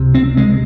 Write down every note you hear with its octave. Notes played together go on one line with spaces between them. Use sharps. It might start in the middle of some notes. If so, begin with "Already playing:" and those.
Already playing: C#2 C3
C4
G#3